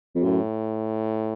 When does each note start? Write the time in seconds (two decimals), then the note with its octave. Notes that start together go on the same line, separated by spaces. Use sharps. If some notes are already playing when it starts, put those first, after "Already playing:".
0.15 F2
0.23 F#2 A2